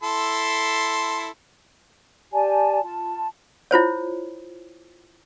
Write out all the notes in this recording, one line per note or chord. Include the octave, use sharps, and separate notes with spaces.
E4 A4 C6
G4 D5 G#5 A5
F4 A5
E4 F4 C5 C#5